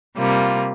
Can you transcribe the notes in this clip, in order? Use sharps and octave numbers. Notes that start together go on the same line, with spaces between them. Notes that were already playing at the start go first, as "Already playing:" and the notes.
C3 G3 A#3 F4